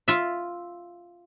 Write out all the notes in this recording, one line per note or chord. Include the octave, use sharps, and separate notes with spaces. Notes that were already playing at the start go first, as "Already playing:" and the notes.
F4 E5